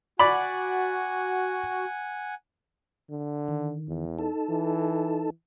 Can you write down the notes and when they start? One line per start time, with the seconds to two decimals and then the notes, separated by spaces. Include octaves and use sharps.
0.19 F#4 D5 F#5 G#5 B5
3.10 D3
3.48 D#3
3.88 E2
4.19 D#4 A4 A5
4.50 E3